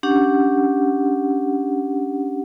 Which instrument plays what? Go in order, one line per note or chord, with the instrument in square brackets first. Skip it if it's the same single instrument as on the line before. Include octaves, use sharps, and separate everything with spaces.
[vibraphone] C#4 D4 G4 F#5